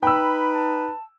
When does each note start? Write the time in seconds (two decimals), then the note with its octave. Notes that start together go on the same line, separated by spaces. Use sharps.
0.03 D#4 B4 G5 B5 E6
0.53 A5